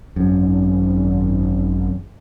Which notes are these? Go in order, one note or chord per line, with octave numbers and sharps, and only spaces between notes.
G#1 F#2